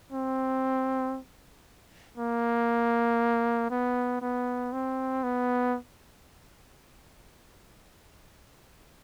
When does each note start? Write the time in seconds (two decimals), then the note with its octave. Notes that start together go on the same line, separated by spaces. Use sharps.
0.12 C4
2.18 A#3
3.70 B3
4.22 B3
4.73 C4
5.24 B3